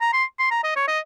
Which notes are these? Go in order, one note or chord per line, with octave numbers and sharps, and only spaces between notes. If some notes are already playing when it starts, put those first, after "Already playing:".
A#5
C6
C6
A#5
D#5
C#5
D#5